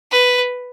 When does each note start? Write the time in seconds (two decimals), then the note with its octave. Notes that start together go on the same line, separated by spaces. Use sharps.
0.11 B4